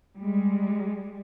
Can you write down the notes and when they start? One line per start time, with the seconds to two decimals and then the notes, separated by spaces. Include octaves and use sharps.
0.20 G3 G#3